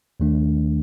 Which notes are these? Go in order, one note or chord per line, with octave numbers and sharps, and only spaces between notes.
D#2 D#3 A3 D4